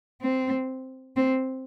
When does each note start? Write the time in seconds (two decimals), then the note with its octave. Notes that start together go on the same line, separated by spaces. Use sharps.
0.21 C4
1.16 C4